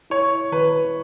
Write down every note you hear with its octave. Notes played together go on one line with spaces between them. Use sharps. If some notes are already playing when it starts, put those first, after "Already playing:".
E4 C#5
D#3 B4